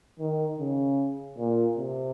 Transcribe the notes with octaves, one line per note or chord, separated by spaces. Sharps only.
D#3
C#3
A#2
C3